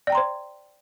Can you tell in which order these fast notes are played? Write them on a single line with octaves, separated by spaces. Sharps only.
D5 G5 A#5 C6 C5